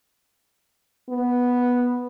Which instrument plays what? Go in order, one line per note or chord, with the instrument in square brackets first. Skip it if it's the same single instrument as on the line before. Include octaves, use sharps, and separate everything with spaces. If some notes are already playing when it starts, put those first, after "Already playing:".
[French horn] B3